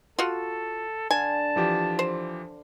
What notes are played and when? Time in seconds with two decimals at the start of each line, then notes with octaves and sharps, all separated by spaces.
0.19 F4 F#4 A4
1.11 D3 F5 G#5 A5
1.56 E3 F3 G4
1.99 C5